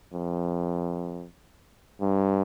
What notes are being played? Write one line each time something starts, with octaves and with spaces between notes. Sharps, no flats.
F2
G2